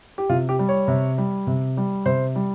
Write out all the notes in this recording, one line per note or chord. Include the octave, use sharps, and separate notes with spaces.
G4
C3 F4
G4
G3
C#5
C3
G3
C3
G3
C3 C5
G3